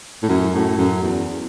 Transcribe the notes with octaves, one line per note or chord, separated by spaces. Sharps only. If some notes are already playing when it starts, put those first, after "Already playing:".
A2
F#2
A2
F#2
E2